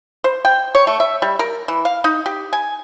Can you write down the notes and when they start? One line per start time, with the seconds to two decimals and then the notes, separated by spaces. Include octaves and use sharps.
0.24 C5
0.45 G5
0.75 C#5
0.87 A3
1.00 E5
1.22 G3
1.39 A#4
1.68 E3
1.85 F5
2.04 D#4
2.26 G4
2.53 G#5